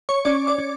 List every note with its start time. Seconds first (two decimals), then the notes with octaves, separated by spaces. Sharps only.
0.09 C#5 C#6
0.25 C#4 D5 D6
0.47 D5 D6
0.58 C#4